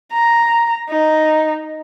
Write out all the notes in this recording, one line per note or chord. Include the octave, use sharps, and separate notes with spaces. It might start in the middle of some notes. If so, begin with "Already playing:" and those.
A#5
D#4